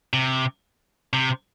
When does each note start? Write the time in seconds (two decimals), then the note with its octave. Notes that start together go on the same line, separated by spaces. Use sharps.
0.13 C3
1.13 C3